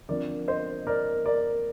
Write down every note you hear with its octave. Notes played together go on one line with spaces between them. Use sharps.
D3 F3 C4 A#4 D5
C5 D#5
A#4 D5
A#4 D5